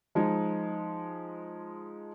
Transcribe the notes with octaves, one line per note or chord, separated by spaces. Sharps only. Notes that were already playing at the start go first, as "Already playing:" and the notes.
F3 G#3 D#4